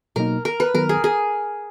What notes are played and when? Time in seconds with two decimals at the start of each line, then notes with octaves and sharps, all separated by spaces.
0.16 B2 F#3 A#3 D#4 A#4
0.45 A#4
0.60 B4
0.74 D#3 F#3 B3 A#4
0.89 G#4
1.04 G#4